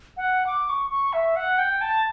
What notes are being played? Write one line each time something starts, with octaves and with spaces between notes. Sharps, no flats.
F#5
D6
C#6
C#6
E5
F#5
G5
A5